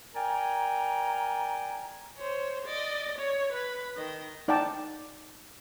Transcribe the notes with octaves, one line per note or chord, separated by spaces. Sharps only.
A#4 D5 G5 G#5 A#5
C5 C#5
D5 D#5
C#5
B4 B5
D#3 D#5
D#4 D5 F#5 G5 A5 A#5